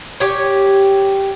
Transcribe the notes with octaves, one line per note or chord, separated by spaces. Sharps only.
G4 C#5